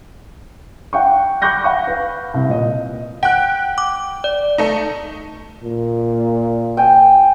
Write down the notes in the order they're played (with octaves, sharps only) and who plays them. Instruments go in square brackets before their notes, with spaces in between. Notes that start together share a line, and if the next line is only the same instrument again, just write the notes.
[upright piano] F#5 G5 C#6
B5 C#6 D6 F#6 G6 A#6
F#5 B5 C#6
B4 F5
C2
A#2 D#5
[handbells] F#5 [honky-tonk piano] G5 F#6
[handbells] D6
D5
[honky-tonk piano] A3 D#4
[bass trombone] A#2
[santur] G5 G#5